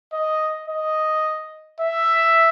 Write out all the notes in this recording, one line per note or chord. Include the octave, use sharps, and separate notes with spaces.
D#5
D#5
E5